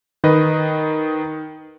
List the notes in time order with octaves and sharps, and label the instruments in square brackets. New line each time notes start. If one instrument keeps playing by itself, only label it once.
[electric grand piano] D#3 B4 D#5